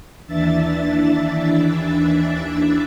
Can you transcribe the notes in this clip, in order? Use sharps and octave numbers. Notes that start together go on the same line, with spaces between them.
D#2 E3 D4 E5 A6